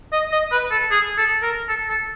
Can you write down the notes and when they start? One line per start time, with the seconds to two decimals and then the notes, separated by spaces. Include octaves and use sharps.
0.13 D#5
0.32 D#5
0.52 B4
0.71 A4
0.91 G#4
1.18 A4
1.42 A#4
1.69 A4
1.89 A4